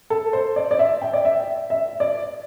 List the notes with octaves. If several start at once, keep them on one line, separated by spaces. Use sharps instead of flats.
A4
C5
D5
D5
E5
G5
D5
E5
E5
D5